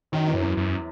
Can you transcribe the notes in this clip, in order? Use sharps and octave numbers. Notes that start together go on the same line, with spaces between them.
F#2 D#3 F#3
E2 E3
F#2
E2 E3
F#2